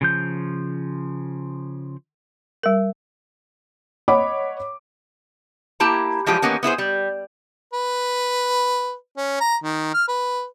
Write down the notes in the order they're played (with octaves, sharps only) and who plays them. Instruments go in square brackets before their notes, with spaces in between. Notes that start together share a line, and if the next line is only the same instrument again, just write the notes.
[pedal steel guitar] C#3 F3 G6
[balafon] G3 A#4
[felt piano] C#5 D#5 F#5 B5 D6
[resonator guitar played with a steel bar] A#3 E4 G4 A5 A#5
E3 F3 G3 G#3 G4
D#3 E3 A#3 B3 C#4
B3 E4 G#4 C5
G3
[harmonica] B4
C#4
A#5
D#3
F6
B4